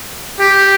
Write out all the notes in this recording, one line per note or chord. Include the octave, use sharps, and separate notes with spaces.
G4